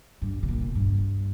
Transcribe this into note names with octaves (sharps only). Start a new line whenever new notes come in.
G2
C#3
A#2
G2